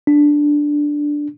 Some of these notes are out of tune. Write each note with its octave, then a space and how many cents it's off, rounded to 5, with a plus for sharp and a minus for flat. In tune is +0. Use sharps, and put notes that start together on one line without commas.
D4 +0